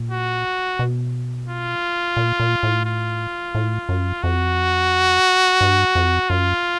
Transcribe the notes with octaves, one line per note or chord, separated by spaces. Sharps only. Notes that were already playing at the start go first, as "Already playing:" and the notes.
Already playing: A#2
F#4
B2
F4
A#2
A#2
A2
F4
A2
F#2
F2 F#4
G2
F2
F#2 F4